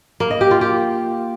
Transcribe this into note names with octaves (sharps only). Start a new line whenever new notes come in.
A#3
D#5
G4
F4
G4